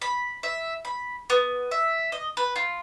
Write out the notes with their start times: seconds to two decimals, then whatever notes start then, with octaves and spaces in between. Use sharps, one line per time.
0.02 B5
0.43 E5
0.85 B5
1.30 B3
1.71 E5
2.12 D#5
2.37 B4
2.56 F4